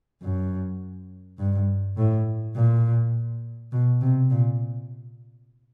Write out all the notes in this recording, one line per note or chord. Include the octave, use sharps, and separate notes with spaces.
F#2
G2
A2
A#2
B2
C3
A#2